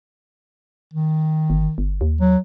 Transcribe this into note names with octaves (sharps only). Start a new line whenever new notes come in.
D#3
G1
G1
D#2
F#3